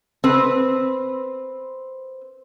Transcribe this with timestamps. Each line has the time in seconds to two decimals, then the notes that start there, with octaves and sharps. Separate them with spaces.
0.24 C4 B4